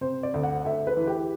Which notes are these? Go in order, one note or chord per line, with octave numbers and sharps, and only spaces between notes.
C3 C5
D5
D2
F#5
D2 E5
B4
E3
G4